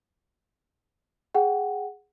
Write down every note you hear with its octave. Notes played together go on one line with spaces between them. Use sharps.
G#4 F#5 G5